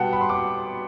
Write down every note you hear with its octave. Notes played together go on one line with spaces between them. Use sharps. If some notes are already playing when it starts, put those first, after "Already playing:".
Already playing: B2 G3 B3 F#5 G5 A5
B5
C6
D6